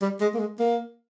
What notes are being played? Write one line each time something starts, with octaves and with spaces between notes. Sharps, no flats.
G3
G#3
A#3
G#3
A#3